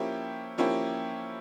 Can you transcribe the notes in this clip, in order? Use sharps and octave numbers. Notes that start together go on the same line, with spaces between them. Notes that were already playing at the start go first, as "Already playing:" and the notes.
Already playing: F3 A#3 C#4 E4 G4
F3 A#3 C#4 E4 G4